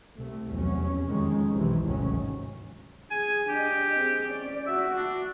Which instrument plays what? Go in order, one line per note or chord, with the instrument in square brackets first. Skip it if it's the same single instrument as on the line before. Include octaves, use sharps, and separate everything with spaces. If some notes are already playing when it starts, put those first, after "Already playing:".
[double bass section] C2 C3 A3
F1 E2 F#3 C#4
F2 D#3 G#3 C#4
B1 C3 E3
G#1 D2 D#3 F#3 C#4
[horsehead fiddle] G#4 [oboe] G#5
[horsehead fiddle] D4 D#5 [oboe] G4
[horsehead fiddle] C4 G#4
C#4 D5
[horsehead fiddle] F#4 [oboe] E5
[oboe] D4